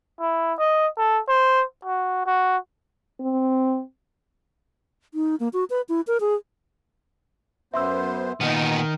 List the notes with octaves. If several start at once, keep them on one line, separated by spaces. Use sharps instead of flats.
E4
D#5
A4
C5
F#4
F#4
C4
D#4
A#3
F#4
B4
E4
A#4
G#4
F#2 B3 C5 E5 C6 E6
A#2 D#3 B3 D#4